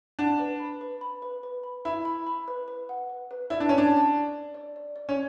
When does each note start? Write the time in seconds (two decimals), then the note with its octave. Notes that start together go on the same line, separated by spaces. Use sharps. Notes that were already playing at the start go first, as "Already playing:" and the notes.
0.19 D4 F#5
0.39 B4
0.60 B5
0.81 B4
1.01 B5
1.22 B4
1.43 B4
1.63 B5
1.85 E4 B5
2.05 B5
2.27 B5
2.48 B4
2.68 B4
2.89 F#5
3.10 B4
3.31 B4
3.50 E4 D5
3.60 D4
3.69 C#4 D5
3.78 D4
3.92 A5
4.14 D5
4.34 D5
4.55 D5
4.76 D5
4.96 D5
5.09 C#4